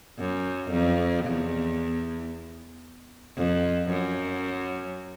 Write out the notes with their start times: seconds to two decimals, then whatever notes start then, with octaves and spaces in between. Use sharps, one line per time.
0.19 F#2
0.71 F2
1.25 E2
3.37 F2
3.90 F#2